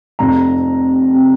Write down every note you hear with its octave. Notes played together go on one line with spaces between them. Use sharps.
F1 F2 C3 A#5
C3